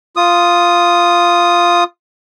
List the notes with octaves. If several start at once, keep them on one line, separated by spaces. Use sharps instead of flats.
F4 D#6